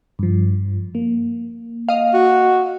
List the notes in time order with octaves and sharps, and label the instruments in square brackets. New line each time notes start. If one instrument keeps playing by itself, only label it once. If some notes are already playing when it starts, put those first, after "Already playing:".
[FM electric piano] G2 F3
A#3
[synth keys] D#5 F5
[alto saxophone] F#4